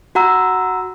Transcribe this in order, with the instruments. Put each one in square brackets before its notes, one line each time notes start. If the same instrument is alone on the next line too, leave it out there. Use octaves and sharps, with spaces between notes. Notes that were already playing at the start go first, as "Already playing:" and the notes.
[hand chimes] F#4 F#5 A#5 E6